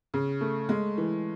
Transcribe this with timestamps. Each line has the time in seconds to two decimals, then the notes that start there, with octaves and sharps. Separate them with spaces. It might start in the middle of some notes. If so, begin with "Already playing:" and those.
0.14 C#3
0.41 A3
0.69 G#3
0.98 E3